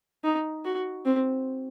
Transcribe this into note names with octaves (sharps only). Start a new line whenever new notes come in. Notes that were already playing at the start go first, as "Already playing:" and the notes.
D#4
F#4
C4